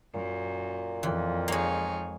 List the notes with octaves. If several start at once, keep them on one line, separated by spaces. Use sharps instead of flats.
F#2 A#2
F2 E3
G#3 A#3 D#4 G#4 C#5